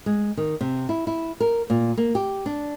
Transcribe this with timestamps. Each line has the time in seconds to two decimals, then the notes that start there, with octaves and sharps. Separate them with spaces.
0.06 G#3
0.37 D#3
0.61 C3
0.89 E4
1.07 E4
1.40 A#4
1.70 A#2
1.97 A#3
2.15 G4
2.46 D4